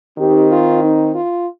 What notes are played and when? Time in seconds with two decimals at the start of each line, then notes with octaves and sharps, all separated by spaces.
0.19 D#3 C4 D#4 G4
0.50 F4
0.82 D#4
1.13 F4